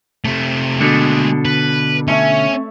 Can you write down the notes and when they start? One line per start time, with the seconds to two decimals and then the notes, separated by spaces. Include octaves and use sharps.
0.25 C3 A3
0.81 B2 D3 G#3 A3
1.45 B4
2.08 A3 C#4 C#5 E5